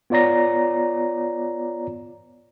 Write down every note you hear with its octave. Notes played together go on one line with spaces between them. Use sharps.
B3 F4 C#5 D5 A#5 A#6